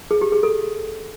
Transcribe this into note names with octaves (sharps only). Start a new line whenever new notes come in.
G#4
G4
G#4
A4